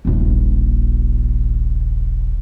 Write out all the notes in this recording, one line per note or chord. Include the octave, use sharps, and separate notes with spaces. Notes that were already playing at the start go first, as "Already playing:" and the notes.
D#1 A#1